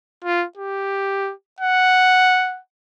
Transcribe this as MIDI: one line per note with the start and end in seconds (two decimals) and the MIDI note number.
0.24 0.45 65
0.57 1.32 67
1.60 2.60 78